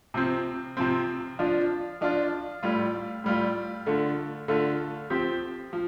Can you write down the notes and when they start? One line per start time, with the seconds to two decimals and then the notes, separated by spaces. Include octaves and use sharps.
0.14 C3 F3 C4
0.77 C3 F3 C4
1.39 F3 D4 F4
2.01 F3 D4 F4
2.63 A2 G3 F4
3.24 A2 G3 F4
3.86 D3 A3 F4
4.48 D3 A3 F4
5.10 F3 C4 G4
5.73 F3